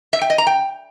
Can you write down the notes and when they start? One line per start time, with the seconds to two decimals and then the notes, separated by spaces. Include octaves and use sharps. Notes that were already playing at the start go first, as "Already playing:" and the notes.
0.13 E5
0.21 G5
0.30 D#5
0.38 A#5
0.47 G5